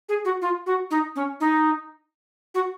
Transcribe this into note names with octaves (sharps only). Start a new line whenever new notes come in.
G#4
F#4
F4
F#4
D#4
C#4
D#4
F#4